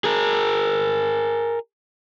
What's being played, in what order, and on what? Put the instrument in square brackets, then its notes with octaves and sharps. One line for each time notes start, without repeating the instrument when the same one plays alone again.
[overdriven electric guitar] G#4 A#4